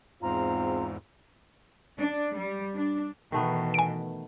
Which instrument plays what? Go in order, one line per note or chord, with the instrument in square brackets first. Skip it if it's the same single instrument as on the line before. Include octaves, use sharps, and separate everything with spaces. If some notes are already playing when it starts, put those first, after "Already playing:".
[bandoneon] E2 G#2 [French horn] C4 [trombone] F4 [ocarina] A#5
[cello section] D4
G3
D4
[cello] B2 E3 [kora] D#3 A3 B3
[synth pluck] G#5 D7